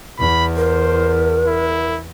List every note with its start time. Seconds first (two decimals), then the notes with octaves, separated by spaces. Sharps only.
0.19 E2 B5
0.57 A#4 C5
1.46 E4